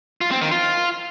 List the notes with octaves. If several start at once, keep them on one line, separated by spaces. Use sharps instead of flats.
F4
C4
D#3
F4